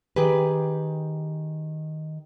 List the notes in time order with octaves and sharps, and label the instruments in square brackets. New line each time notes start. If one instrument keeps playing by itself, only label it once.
[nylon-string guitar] D#3 G4 G#4 B4